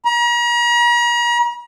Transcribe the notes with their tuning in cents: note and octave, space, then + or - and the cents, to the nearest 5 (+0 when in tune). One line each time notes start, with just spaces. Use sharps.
A#5 +40